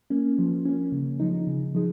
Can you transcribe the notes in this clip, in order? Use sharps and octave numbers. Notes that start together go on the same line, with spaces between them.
A#3 C#4
F3
A#3 C#4
C#3
F3 G#3 D#4
C#3
F3 G#3 D#4